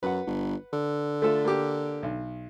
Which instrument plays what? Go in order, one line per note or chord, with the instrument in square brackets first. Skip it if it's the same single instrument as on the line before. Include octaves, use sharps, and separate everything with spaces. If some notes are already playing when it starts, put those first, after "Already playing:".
[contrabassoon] F#2 [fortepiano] B4 F#5
[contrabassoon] G1
D3
[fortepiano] A3 F4 A4
A#3 G4
B1